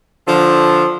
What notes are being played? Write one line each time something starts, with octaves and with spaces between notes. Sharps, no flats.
D3 F3